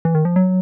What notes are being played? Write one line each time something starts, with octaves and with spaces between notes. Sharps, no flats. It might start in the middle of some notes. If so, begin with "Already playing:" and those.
E3
D#3
F3
F#3